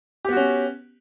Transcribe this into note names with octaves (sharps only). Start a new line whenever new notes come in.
B3 C#4 F#4 G4